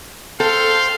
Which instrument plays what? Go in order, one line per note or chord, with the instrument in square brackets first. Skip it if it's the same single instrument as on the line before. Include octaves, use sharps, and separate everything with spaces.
[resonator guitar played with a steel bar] A4 [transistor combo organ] C5 G5 [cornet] F5